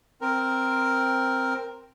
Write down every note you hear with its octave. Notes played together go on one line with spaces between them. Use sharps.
C4 A#4